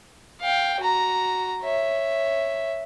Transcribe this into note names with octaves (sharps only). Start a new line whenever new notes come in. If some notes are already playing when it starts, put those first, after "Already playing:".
F5 G5
F#4 A#5
C#5 E5